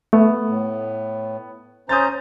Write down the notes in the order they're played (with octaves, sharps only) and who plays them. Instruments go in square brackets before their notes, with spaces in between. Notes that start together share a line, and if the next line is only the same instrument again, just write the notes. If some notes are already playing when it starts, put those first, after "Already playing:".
[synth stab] A3 [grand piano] B3
[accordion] A2
[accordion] C#4 C5 A#5 [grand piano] D#6 G6 A6